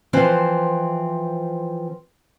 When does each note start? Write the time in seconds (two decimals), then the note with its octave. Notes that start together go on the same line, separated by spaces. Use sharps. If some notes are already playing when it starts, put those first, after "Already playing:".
0.13 E3 F3 C4 B4 C5